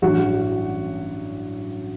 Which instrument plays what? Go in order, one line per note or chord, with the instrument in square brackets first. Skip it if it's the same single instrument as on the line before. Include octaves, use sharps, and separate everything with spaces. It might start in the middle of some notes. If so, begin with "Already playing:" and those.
[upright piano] A1 G2 F#3 F#4